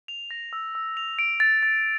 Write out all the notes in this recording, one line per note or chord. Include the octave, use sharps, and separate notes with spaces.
F7
A#6
E6
E6
F7
D7
A6
A6